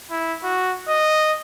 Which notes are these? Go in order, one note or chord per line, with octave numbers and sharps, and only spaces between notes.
E4
F#4
D#5